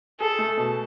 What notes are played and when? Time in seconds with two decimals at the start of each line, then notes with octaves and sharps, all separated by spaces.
0.20 G#4 A4
0.39 A3
0.57 B2